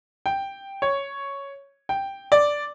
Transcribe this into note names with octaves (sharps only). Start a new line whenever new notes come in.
G5
C#5
G5
D5